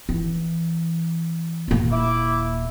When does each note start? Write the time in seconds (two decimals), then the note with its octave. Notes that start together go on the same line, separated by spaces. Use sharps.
0.09 E3
1.68 D#1 A#3
1.91 E4 D6